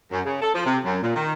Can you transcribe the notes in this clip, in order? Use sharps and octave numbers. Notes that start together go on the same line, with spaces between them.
F#2
C#3
A4
F3
C3
F#2
A#2
D#3